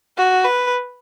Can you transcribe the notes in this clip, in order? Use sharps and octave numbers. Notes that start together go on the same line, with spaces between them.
F#4
B4